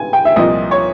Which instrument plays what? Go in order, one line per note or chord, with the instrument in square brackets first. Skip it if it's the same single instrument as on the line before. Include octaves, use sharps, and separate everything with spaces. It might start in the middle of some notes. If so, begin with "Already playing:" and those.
Already playing: [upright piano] G#5
G5
E5
C2 A#2 F3 D#5
C#5